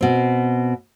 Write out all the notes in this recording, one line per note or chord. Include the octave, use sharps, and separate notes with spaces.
B2 C4